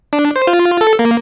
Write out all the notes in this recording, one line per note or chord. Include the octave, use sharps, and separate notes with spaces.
D4
C5
F4
A4
A#3